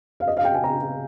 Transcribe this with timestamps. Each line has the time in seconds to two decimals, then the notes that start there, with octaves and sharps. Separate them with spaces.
0.20 F5
0.27 D#5
0.37 F5
0.45 G5
0.54 G#5
0.64 A#5